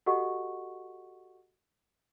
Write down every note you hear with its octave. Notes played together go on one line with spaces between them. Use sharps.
F#4 G4 A4 D#5 F#5 C#6